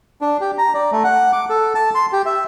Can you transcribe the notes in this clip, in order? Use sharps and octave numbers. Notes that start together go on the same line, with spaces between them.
D4
G4
A#5
D5
A3
F#5
D6
A4
A5
C6
G4
E5